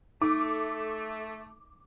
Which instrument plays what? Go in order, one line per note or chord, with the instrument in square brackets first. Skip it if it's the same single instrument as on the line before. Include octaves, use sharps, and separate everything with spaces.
[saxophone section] A3 [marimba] D#4 [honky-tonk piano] D6